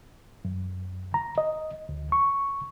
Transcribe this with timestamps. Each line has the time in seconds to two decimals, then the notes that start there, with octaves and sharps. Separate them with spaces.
0.45 F#2
1.14 A#5
1.38 D#5
1.89 D2
2.12 C#6